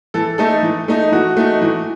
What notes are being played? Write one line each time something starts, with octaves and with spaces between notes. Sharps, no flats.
E3 A4
A3 D#4 A4
E3
A3 D#4
E3 F#4
A3 D#4
E3